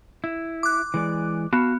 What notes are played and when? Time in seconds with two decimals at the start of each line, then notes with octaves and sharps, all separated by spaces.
0.24 E4
0.63 D6 F#6
0.94 E3 G#3 D5
1.53 B3 F#4 F5 A5